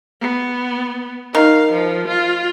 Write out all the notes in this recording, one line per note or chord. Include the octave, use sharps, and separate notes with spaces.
B3
D#3 F5
F3
F4